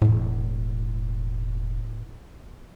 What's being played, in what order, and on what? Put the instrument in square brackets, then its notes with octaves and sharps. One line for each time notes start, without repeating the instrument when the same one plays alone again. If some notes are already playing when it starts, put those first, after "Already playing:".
[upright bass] E1 G#3 [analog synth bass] A2